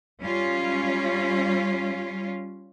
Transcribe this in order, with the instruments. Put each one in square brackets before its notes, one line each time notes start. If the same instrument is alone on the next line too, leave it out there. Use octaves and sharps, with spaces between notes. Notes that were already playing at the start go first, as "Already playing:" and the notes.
[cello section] G3 C#4 F4